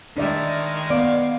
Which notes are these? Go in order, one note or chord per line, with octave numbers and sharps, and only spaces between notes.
D#3 G#3 D4 D5 E5
B3 D5 F5